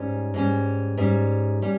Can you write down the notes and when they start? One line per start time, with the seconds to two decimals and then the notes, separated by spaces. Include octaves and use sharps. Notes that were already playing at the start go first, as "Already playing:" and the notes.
Already playing: G#2 G3 C#4
0.34 G#2 G3 C#4
0.97 G#2 G3 C#4
1.62 G3 C#4